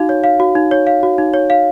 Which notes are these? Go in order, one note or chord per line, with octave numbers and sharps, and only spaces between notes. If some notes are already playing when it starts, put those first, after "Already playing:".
Already playing: D#4 F#4 F5
C#5
F5
F#4
D#4
C#5
F5
F#4
D#4
C#5
F5